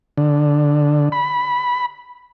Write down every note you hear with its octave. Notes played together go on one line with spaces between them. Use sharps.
D3
B5